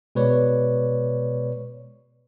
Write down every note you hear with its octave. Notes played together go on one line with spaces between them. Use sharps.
B2 G#3 B4 C#5 D5